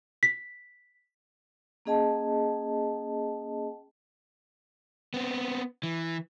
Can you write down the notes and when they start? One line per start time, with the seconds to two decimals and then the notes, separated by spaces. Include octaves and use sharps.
0.23 B6
1.86 A#3 C#4 G#4 D#5 G5 A5
5.14 B3 C4
5.83 E3